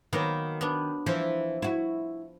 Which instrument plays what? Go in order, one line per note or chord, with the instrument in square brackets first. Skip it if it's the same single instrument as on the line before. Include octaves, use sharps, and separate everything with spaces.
[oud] D#3 [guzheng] F#3 A#3 B3
[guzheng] B3 D4
[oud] E3 [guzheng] F3
[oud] E4 F#4